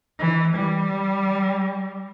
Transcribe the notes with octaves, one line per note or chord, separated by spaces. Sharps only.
E3
G3